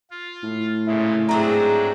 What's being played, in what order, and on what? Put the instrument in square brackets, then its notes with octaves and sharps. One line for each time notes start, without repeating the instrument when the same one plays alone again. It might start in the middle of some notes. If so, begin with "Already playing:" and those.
[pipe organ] F4
[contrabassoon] A2
[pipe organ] A#2 C#3 G#3 [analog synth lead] E4
[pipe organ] G#2 F#3 D4 [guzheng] A3 C4 G#4 [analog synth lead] A#5